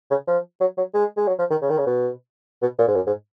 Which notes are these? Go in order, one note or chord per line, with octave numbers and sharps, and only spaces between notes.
C#3
F3
F#3
F#3
G#3
G#3
F#3
F3
D#3
C#3
D#3
C#3
B2
B2
A#2
G#2
F#2
G#2